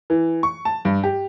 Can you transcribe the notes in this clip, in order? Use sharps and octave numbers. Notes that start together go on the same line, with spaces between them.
E3
C#6
A5
G2
G4